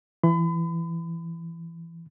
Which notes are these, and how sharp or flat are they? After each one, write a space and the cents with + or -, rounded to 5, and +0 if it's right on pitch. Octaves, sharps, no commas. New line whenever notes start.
E3 +20 B5 +40